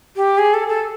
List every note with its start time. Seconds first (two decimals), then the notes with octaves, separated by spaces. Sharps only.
0.16 G4
0.38 G#4
0.54 A4
0.68 A4